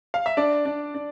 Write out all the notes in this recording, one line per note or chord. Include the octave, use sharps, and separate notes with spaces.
F5
E5
D4 D5
D4
D4